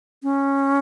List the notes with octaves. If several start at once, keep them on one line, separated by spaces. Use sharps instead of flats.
C#4